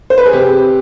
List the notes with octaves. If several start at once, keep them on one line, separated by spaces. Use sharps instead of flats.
C5
B4
G#4
C3 G4